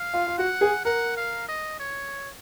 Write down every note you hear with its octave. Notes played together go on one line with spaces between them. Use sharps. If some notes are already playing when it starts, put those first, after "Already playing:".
Already playing: F5
F4
F4
F#4 F#5
G#4
A#4 F#5
F5
D#5
C#5